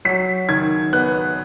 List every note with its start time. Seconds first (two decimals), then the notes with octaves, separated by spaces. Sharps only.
0.05 F#3 B6
0.49 D#3 G#6
0.93 B3 F#6